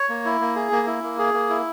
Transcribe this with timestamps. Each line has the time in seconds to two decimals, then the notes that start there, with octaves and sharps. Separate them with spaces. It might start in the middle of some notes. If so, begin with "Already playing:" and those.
Already playing: C#5
0.09 A#3
0.25 E4
0.40 A#3
0.56 G#4
0.72 A#3
0.87 E4
1.03 A#3
1.19 G#4
1.34 A#3
1.49 E4